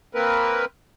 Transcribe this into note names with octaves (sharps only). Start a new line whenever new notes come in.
A#3 C4 A#4 B4